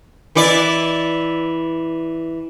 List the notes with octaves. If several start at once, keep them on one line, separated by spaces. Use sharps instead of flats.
E3 E4 D5